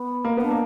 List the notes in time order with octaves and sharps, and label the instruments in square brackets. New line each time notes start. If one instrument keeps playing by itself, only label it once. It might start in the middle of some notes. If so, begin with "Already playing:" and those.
Already playing: [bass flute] B3
[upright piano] A#3
[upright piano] B3 [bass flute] D4
[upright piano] A#3